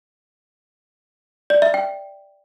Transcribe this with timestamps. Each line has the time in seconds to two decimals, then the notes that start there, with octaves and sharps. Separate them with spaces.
1.50 D5
1.62 E5
1.74 G5